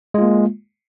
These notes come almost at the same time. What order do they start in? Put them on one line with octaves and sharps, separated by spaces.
G#3 F4 A#3